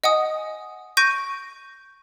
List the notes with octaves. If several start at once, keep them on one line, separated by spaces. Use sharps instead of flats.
D#5 F#5 G#5 D#6
C#6 G6 A#6 D7 D#7